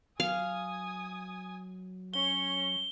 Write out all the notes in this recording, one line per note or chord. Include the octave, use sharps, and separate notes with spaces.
F#3 F5 G#5 D#6
C#4 C#5 G7